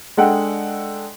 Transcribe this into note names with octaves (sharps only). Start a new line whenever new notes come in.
G#3 D4 A4 D#5 F#5 G5